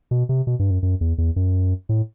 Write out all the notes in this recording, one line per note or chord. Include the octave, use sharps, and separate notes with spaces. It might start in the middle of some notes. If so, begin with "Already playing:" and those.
B2
C3
B2
G2
F#2
F#2
E2
E2
F#2
A2